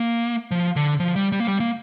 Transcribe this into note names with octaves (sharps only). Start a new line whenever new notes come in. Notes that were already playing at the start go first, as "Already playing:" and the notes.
Already playing: A#3
F3
D3
F3
G3
G3
A#3
G3
A#3